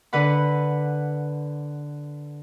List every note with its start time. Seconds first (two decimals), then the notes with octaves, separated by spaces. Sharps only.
0.13 D3 B4 F#5 B5